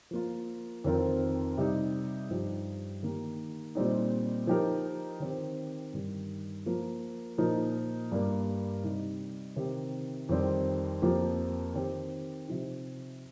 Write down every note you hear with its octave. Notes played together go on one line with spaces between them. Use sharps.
F3 A#3 F4
F2 D#3 C4 F4 A#4
C3 G3 D#4
G2 F3 D#4 G4
D#3 A#3 G4
A#2 G3 C4 D#4
F3 D#4 G4 A#4
D#3 C4 G4
G2 D#3 G3
F3 A#3 F4
A#2 F3 D#4 A#4
G2 G3 A#3
C3 G3 D#4
C3 D#3 C4 G4
F2 D#3 G3 C4 G4
F2 F3 A#3 G4
D#3 C4 G4
C3 F3 D#4